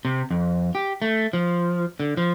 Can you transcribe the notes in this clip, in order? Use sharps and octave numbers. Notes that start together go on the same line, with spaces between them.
C3
F2
G4
A3
F3
D3
F3